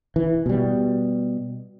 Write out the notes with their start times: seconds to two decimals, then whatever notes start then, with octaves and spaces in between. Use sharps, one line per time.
0.16 E3
0.46 B2 G3